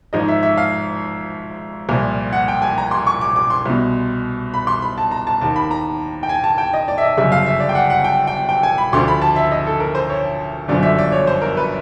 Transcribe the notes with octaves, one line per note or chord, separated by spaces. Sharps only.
G#1 G#2 F3 D#5
E5
E5
F5
C2 A#2 F3
F#5
G5
G#5
A#5
C6
C#6
D6
D6
C6
C2 B2
B5
C6
B5
A5
A#5
A5
D#2 D#3 A5
B5
A#5
G5
G#5
A5
G5
D#5
D5
E5
D#5
G1 F#2 C#3 E5
F5
E5
D5
G5
F#5
F#5
G5
G5
G5
G#5
B5
D2 D3 F3 C6
B5
A5
E5
D#5
A4
A#4
C5
C#5
G1 F#2 D3 F3 D5
E5
D5
C#5
C5
A#4
B4